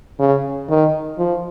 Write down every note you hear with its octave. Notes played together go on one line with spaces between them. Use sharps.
C#3
D#3
F3